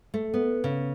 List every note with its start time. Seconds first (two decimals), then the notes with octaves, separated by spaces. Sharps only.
0.14 A3
0.34 B3
0.64 C#3